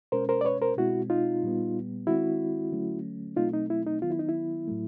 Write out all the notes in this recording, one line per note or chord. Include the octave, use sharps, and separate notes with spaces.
B2 G#3 C#4 A#4 C5
A#4 C5
D5
B4 C#5
A#4 C5
B2 G#3 C4 E4 F#4
D#4 F4
A#2 G3 B3
D#3 G#3 C4 E4 F#4
D3 F#3 A3 C#4
B2 F#3 A3 C4 D#4 F4
D#4
E4
D#4
D#3 F#3 B3 F4
E4
D#4
E4
A2 F#3 A3